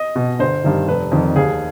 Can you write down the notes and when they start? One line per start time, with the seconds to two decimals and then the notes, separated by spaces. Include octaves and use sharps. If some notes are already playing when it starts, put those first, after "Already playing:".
Already playing: D#5
0.16 B2
0.39 G1 C5
0.64 G2 D#3
0.88 F1 B4
1.12 F2 D#3
1.36 D#2 G#4